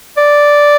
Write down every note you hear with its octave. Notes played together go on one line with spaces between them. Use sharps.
D5